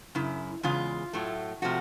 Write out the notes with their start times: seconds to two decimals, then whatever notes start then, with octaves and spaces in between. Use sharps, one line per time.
0.15 F#2 C#3 E4
0.63 E2 C#3 G#3 F4
1.13 A2 F#3 A3
1.62 C3 F3 A3 F#4